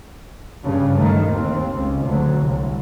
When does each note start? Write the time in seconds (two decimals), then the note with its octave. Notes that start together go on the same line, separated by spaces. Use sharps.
0.64 G2 C#3
0.99 D#3 A3
1.28 D#2 C4
1.75 C#2
2.07 D2 F#3
2.41 C2